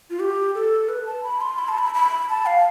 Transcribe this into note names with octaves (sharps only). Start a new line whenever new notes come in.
F4
G4
A4
B4
A5
B5
C6
B5
A5
B5
B5
A5
F5